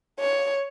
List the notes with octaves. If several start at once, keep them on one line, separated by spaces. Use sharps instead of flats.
C#5